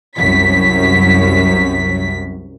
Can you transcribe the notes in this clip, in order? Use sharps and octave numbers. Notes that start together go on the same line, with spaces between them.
C2 F#2 B6